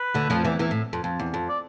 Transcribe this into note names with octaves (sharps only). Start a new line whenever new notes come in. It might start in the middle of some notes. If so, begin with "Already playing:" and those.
Already playing: B4
D2 D3
F2 F3
E2 E3
E2 E3
A2
F2
F2
E2
F2
D5